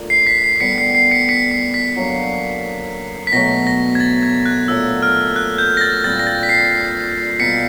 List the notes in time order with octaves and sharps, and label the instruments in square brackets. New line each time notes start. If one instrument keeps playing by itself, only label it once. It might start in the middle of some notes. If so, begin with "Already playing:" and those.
Already playing: [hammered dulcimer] A3 D4 F4 A#4
[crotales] C7
B6
C7
[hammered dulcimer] D3 G3 B3 [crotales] B6 C#7
[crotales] C7
C7
B6 C#7
B6 C#7
C7
B6
[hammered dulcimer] F#3 A#3 D4
[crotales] B6
[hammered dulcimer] B2 F#3 A3 [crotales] A#6
[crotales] A#6
G#6
A6
G#6
F#6
[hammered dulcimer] A#2 F#3 A3 D4 [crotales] E6
[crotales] F6
F#6
G6
A#6
A6
[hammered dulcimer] A#2 G3 C4 [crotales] A6
[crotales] A#6
A6
B6
C7
[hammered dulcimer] B2 G3 A#3 [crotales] B6 C#7